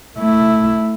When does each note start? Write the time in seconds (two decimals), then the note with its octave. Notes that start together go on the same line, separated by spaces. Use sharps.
0.17 A3 E4